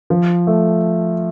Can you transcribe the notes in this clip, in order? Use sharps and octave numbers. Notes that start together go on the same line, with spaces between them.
F3
A3